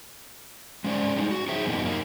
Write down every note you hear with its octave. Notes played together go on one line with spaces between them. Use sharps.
G#3 C#4 C5 D5
G3 G#3 D#4
F#4
D#4 G#4 C5 E5
F#2 B2 E3 A#3 D#4
A#3 D#4